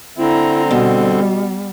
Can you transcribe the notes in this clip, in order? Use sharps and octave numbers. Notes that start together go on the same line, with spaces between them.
D3 C4 E4 A#5
B2 G3